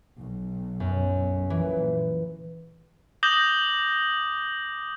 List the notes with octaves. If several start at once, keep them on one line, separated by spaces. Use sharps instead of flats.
B1
F#2
A#2 E3
D6 D#6 G6 A#6 F#7 G7